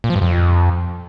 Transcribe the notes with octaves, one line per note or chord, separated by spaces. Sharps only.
A#2
F3
G2
F2